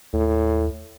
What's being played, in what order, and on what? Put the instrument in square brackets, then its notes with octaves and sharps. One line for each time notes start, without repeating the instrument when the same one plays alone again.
[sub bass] D#2 [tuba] A2